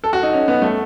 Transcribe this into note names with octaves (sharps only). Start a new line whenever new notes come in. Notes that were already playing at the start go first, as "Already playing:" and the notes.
A4
F#4
D#4
C#4
B3
A3